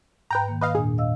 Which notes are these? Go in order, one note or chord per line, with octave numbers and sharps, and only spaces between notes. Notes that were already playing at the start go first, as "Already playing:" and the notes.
G#2 B4 G5 A#5 G6
D#3 A#3
B4 D#5 F5
E2 A#2 D4 G#4
D#5 F5 E6